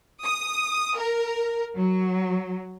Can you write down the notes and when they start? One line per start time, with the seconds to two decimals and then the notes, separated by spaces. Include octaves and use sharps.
0.24 D#6
0.97 A#4
1.77 F#3